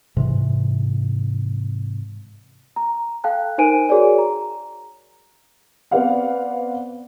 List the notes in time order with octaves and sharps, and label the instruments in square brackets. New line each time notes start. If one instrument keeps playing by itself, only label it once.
[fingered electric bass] G#2 C3 E3
[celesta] A#5
A4 F5 G5 A5 F#6
D#4 A#4 C5 G#5 D7 D#7
F#4 G#4 A#4 C#5 D5 G#5
A#5
[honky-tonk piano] B3 C4 D5 F5 F#5